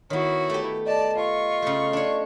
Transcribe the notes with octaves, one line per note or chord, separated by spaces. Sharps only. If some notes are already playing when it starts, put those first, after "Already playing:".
D#3 B3 E4 F#4 C#5
A3 G4
D5 D#5 A5
F4 C#6
C#3 A3
D4 C#5